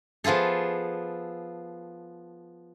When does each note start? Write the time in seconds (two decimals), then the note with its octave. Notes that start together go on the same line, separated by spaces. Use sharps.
0.24 F3 B3 F4 G#4 A4